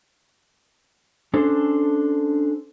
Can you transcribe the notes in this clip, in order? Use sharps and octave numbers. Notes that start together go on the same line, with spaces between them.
C#4 D4 A4 C5